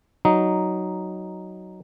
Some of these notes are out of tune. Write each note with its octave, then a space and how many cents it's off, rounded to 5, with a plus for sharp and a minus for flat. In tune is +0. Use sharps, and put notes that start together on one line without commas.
F#3 +10 D#4 +0